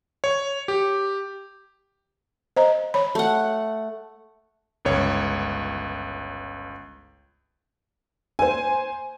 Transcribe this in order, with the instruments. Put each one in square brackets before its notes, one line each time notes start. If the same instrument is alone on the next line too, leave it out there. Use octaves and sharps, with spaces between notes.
[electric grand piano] C#5
G4
[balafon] C5 D#5 A#5
C#5 B5
[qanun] A3 F#5
[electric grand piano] G1 C#2 C#5
[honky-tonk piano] C5 G#5